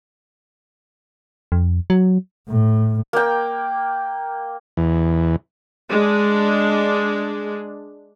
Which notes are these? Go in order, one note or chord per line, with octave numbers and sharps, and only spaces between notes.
F2
F#3
A2
A#3 G5
E2
G#3 D4